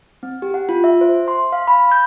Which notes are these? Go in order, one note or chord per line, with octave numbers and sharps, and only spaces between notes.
C4
G4
F#5
F4
E5
C5
C6
F5
B5
G6